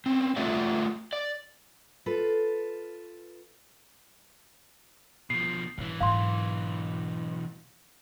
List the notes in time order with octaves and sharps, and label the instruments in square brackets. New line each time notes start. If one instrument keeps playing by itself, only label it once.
[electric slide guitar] C4 C#4
A3 F4 F#4 D5 E5
D5
[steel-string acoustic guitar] F4 A4 B4
[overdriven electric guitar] B2 F3 [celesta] C7
[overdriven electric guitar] B1 E3 [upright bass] G#2
[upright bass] G#2 F#3 [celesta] F5 C6